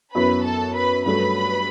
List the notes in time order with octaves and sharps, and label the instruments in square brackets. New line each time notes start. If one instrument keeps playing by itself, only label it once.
[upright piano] F#2 F#3 B3 E4 [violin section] B4 B5
[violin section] A4 A5
B4 B5
[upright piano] G2 F#3 A3 [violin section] B4 B5